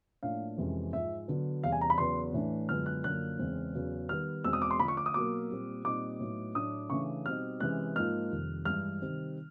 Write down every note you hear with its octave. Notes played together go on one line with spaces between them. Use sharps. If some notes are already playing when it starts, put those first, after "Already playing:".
A2 F3 A#3 D4 F5
F2 C3 E3 G#3 C#4
G#2 F3 G#3 E5
D3 F#3 B3
E2 C3 E3 G3 F5
G#5
A#5
B5
E2 C#3 F#3 B3 C6
A2 E3 A3 D4
F#2 D3 F3 G#3 B3 F6
F#6
F#2 D3 F3 A#3 D4 F#6
E2 C#3 E3 G#3 C4
E2 C#3 F#3 B3
D#3 G3 B3 F6
E2 B2 G#3 C4 E6
D#6
D6
C6
D3 F3 A3 B5
C#6
D6
D#6
B2 F#3 A#3 D6
A#2 G3 C4
A#2 G3 C4 D#4 D6
A2 F#3 B3 D#4
A2 F#3 A3 D4 D#6
C#3 E3 A3 D4 C#6
B2 G3 C4 D#4 F6
C3 E3 G#3 C#4 F#6
G#2 F3 A#3 D#4 F6
F2 C3 D#3 G3
G2 E3 G#3 F6
C3 D#3 G3 C4 D#4